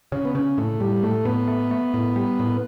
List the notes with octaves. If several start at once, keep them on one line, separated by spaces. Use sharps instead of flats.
C#3 C#4
B3
C#3 C#4
A2 A3
A2 G3
A2 A3
A2 B3
A3
A3
A2
G3
A2